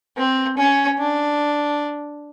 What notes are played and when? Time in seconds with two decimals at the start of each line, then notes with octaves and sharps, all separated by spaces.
0.17 C4
0.58 C#4
0.99 D4